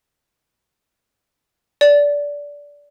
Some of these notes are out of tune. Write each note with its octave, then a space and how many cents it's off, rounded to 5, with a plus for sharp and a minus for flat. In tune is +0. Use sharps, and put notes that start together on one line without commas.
D5 -20